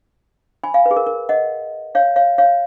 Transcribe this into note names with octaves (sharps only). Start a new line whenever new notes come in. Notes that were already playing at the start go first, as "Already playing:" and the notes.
G#5 B5
F5 G#5
B4
G#4
A#4
A#4
D#5 F#5
C#5 F5
C#5 F5
C#5 F5